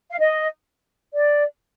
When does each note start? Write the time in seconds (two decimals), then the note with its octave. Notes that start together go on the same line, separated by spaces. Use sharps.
0.10 F5
0.18 D#5
1.15 D5